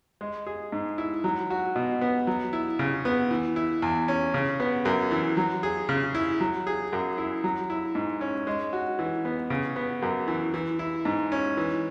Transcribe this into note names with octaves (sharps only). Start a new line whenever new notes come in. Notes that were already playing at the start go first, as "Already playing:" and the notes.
G#3
G#4
G#2
E4
F#3
F#4
B2
B3
F#3
E4
C#3
B3
E3
E4
E2
C#4
C#3
B3
F#2
E3
F#3
G#4
C#3
E4
F#3
G#4
F#2
E4
F#3
E4
G#2
C#4
G#3
F#4
E3
B3
C#3
B3
F#2
E3
E3
E4
G#2
C#4
E3